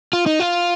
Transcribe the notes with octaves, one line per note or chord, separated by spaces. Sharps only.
F4
D#4
F4